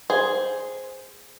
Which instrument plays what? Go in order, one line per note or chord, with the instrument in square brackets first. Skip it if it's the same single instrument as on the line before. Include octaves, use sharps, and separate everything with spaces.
[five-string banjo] G#4 C5